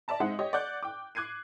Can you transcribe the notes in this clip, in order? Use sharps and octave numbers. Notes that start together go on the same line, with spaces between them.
D5 E5 A5 A#5
G#3 C4 D#4 E5 F#5
G4 C#5 D#5
D5 F#5 D6 F#6 G6
G5 D6
D6 F#6 G#6 C7 D#7